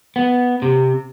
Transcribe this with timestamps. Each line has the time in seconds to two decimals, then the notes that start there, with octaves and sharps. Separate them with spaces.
0.16 B3
0.62 C3